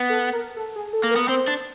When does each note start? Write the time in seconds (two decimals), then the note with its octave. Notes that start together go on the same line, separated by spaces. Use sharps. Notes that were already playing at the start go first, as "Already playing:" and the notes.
Already playing: B3
0.10 A4
0.33 A#4
0.56 A4
0.76 G#4
0.93 A4
1.04 A#3
1.11 A#4
1.16 B3
1.29 C4 C5
1.48 D4